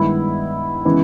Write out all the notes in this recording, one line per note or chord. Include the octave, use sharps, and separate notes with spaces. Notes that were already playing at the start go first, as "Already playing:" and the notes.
Already playing: G2 D#3 G#3 B3 E4
C#3 E3 G#3 B3